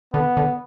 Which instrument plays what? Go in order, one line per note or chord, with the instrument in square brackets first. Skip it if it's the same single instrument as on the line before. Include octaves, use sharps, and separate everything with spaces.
[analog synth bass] D3 [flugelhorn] B3
[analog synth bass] D3